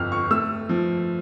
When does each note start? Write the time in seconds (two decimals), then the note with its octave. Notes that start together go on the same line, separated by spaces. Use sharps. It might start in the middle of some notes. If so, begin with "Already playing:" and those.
Already playing: G1 F2 F6
0.12 C#6
0.31 A3 E6
0.69 F3